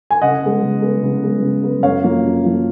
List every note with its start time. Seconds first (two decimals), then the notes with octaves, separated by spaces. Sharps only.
0.10 G#5
0.22 C#3 D#5 F#5
0.43 G#3 B3
0.62 C#3
0.82 G#3 B3
1.03 C#3
1.23 G#3 B3
1.42 C#3
1.63 G#3 B3
1.83 F#2 C#5 F5
2.04 F3 A#3
2.24 F#2
2.43 F3 A#3